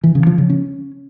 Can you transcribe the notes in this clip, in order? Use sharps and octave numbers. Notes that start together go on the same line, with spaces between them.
E3
C#3
F3
C#3
C#4